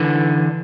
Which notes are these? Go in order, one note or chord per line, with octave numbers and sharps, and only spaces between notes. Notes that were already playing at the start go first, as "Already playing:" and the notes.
Already playing: D3 E3